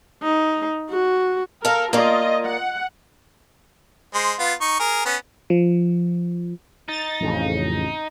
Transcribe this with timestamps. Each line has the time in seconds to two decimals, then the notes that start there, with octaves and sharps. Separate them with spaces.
0.23 D#4
0.90 F#4
1.65 A4 A#4 F5
1.93 A#3 F4 D5 D#5
2.45 F#5
4.14 G#3 C5
4.39 B3 F4
4.61 D#4 C#6
4.80 G#4 A#4
5.05 B3 C#4
5.50 F3
6.88 D#4 A6
7.20 A1 F2 C#3